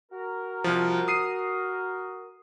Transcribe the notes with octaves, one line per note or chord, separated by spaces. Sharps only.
F#4 A#4
C2 F3
D#6 C7 D#7